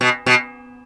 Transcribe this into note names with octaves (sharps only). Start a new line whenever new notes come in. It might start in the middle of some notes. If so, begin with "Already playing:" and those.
B2
B2